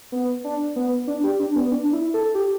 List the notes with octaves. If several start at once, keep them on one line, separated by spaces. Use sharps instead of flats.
B3
D4
B3
D4
G4
D4
B3
D4
E4
A4
G4